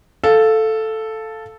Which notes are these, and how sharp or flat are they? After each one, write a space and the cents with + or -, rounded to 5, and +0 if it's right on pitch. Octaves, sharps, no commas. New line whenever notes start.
A4 +0 F5 +0